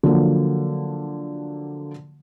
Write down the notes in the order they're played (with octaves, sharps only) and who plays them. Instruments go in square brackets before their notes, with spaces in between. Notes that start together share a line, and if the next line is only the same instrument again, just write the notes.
[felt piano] D3 F3 F#3 A#3